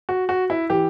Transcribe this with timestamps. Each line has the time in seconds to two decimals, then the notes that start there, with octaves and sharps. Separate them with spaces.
0.09 F#4
0.29 F#4
0.50 E4
0.70 E3 G4